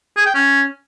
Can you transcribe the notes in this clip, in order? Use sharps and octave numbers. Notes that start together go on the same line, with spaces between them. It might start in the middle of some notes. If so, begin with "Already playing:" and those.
G#4
G5
C#4